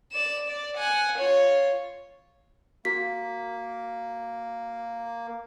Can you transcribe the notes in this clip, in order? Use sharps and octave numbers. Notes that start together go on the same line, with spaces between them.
D5 E7
D5
F#5 G#5
F4 C#5
A#3 F#4 B6